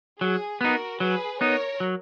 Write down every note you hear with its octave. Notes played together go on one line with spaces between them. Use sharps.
F#3 G#4
B3 D#4 F#4 A#4
F#3 G#4 B4
B3 D#4 A#4 C#5
F#3